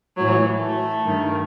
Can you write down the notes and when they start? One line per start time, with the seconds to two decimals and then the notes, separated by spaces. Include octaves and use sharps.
0.16 A2 E3 F#3
0.59 A3
1.03 G2 D#3